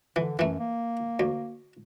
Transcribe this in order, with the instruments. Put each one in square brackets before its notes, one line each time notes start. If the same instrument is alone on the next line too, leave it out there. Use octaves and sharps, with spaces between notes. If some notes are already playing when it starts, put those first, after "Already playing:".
[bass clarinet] D3 [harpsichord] E3
[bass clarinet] F#2 [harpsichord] E3 A3
[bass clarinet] A#3
[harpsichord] D2